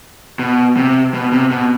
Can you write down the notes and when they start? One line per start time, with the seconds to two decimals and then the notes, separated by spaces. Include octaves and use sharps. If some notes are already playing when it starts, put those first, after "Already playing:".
0.39 B2
0.77 C3
1.14 B2
1.32 C3
1.51 B2